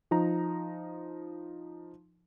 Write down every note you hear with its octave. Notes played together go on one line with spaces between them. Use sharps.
F3 D#4 A#5